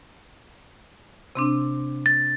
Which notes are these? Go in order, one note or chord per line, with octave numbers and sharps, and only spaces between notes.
C3 C4 D4
A6